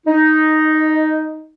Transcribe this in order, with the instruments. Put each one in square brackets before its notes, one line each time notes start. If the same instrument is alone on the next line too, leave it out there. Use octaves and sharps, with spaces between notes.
[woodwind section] D#4